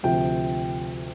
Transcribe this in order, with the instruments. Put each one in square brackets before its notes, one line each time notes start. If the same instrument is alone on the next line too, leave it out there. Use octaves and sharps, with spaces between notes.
[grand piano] D2 C3 F3 G5